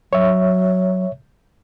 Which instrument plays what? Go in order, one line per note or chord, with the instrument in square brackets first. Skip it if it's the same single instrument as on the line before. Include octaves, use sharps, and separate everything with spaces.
[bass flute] F#3 [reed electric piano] C#5 E5